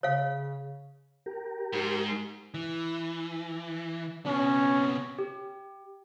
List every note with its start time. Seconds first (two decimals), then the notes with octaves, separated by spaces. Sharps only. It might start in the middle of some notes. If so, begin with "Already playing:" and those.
0.03 C#3 C#5 F5
1.26 G4 A#4
1.73 G#2
2.54 E3
4.26 C3 B3 C#4
5.19 G4